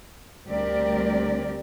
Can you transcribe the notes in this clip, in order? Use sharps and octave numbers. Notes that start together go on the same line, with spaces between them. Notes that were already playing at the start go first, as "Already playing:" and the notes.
D2 G3 C4 G4 A#4 D5